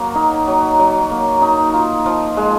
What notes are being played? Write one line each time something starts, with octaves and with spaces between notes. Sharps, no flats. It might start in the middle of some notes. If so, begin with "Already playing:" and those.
Already playing: F#3 A#3
D#4
F#3
F#3
A#3
D#4
F4
F3
G#3